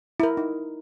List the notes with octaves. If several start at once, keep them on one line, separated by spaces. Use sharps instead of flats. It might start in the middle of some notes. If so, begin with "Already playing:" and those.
E4 A#4
D#4